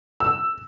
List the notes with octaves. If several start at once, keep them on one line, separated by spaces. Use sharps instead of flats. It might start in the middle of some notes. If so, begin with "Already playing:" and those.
E6